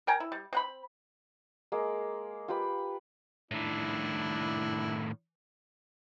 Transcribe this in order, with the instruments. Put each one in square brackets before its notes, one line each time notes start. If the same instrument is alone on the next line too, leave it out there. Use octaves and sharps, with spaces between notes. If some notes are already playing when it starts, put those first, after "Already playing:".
[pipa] A#4 G5 G#5 A#5
E4
G3
C4 F#5 B5
[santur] G#3 A#3
F4 G4 B4 B5
[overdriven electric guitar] A2 D#3 [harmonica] D4 E4